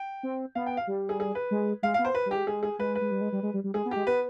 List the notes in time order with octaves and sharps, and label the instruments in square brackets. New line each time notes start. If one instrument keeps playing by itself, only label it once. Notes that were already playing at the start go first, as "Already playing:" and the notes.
Already playing: [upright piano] G5
[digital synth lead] C4
[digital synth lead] B3 [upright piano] F5
[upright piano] G5
F5
[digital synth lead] G3
[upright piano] G#4
G#4
B4
[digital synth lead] G#3
[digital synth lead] G#3 [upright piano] F5
[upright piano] F5
[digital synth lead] B3
[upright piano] C5
B4
[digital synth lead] G3
[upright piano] G4
[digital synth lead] G#3
[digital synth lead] G#3 [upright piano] G#4
[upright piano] G#4
[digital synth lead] G#3 [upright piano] B4
[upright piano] B4
[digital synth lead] G#3
G3
G#3
G3
G#3
G3
G3
[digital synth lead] G#3 [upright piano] G#4
[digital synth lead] B3
[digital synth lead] G#3 [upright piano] G4
[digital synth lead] B3 [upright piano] B4